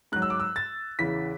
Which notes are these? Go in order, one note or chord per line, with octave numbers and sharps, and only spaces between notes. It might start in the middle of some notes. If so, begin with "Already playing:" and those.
G#2 F#3 F#6
E6
D6
E6
A6
E2 C#3 E3 B6